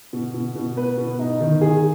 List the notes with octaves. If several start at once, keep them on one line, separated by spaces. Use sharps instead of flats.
B2
B2
B2
B4
B2
D#4
D#3
G#4